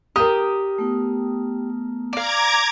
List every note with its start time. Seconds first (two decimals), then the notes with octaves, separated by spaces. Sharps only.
0.16 G4 A#4 D#6
0.78 A3 B3 E4
2.13 D5 F5 A#5 D6 G#6